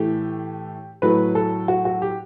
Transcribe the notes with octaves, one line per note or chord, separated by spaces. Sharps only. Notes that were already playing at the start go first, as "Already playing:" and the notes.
Already playing: A2 E3 A3 G4
A2 F#3 A3 B4
A4
F#4
F#4
G4